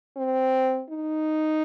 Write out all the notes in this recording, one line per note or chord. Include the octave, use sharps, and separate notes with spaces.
C4
D#4